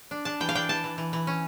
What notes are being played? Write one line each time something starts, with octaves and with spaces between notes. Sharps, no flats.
D4
D4 A5
E3 G5
F5
D4 G5
E3 A5
E3
E3
E3
C#4